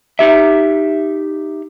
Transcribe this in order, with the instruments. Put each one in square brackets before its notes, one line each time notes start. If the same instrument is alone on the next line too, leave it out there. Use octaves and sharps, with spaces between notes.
[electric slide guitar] D#4 G4 E5